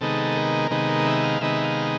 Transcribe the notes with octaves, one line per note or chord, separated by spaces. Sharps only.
C3 D#3 G#3 B3 D#4 A4
A#4
C3 D#3 G#3 B3 D#4
A#4
E5
F5
C3 D#3 G#3 B3 D#4 E5
F5